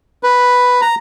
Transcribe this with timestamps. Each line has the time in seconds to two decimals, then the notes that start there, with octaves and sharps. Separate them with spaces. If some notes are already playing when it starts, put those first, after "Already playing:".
0.23 B4
0.82 A#5